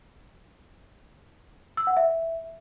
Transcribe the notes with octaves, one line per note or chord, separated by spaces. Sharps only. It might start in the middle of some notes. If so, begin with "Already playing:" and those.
E6
F#5
E5